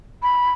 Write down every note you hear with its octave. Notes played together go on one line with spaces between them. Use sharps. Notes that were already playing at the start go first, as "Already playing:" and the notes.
B5